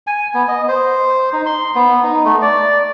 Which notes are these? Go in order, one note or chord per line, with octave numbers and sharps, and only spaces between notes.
G#5
B3
D#5
C5
D#4
C6
B3
D#4
A3
D5